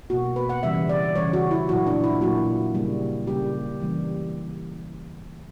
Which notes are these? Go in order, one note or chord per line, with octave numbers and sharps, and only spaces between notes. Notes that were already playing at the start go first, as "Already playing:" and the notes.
B2 A#3 F#4
B4
F#5
C#3 E3 G3 E5
D5
C#3 E3 G3 C#5
F#4
E4
A#2 F#3 A#3 F#4
D4
E4
A#2 F#3 A#3 F#4
C#3 G3 A#3
C#3 G3 A#3 G4
C#3 E3 G3 A#3